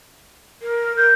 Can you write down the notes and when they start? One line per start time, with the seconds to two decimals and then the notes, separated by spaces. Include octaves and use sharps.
0.62 A#4
0.97 A#4 G6